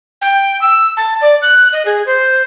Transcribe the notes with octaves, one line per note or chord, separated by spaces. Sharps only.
G5
E6
A5
D5
F#6
D#5
G#4
C5